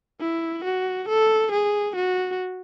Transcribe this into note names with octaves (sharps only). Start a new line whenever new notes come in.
E4
F#4
A4
G#4
F#4